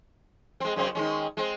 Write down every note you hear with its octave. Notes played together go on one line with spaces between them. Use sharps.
G#3 C4
F#2 C#3 C4
D#3 G#3 C#4
G#3 C4